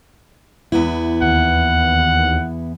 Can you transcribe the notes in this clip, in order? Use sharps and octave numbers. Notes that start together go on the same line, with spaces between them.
E2 B3 E4
D#2 F#5